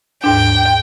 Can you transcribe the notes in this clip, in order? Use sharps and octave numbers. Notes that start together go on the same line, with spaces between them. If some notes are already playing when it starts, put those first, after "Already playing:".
D#2 G#2 D4 G5